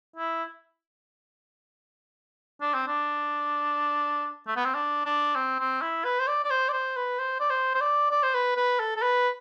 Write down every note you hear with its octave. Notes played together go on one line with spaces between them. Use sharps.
E4
D4
C4
D4
A3
B3
C4
D4
D4
C4
C4
E4
B4
C5
D5
D5
C5
D5
C5
B4
C5
D5
C5
C5
D5
D5
C5
B4
B4
A4
A4
B4